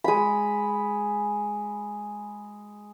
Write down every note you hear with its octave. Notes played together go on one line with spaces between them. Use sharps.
G#3 B5